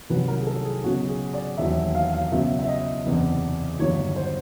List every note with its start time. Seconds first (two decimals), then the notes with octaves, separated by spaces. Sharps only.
0.10 C2 C3 D#3 F#3 B4
0.28 A#4
0.40 G#4
0.47 A4
0.65 G#4
0.84 C#2 B2 F#3 F#4
1.08 G#4
1.33 D5
1.58 E1 D#2 D#3 F#3 E5
1.95 F5
2.13 F5
2.32 C#2 B2 F#3 E5
2.59 E5
2.68 D#5
3.06 F#1 E2 C3 E3
3.79 G1 G2 D#3 F#3 C#5
4.16 C5